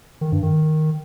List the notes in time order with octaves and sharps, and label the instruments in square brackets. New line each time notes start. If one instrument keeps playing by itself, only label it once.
[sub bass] D#3
G2
D#3